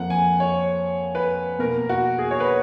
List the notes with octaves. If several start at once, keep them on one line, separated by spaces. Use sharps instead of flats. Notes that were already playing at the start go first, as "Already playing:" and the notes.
Already playing: F2 F3 A#3 F#5
G#5
C#5
B4
B2 A#3 A#4
F#4
G#4
C#5
B4